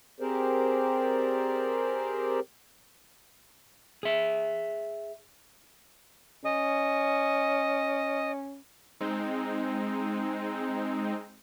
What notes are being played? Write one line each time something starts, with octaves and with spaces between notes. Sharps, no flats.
C4 G4 G#4 A#4 C5 D5
G#4 E5
C#4 D#5
G#3 C4 D#4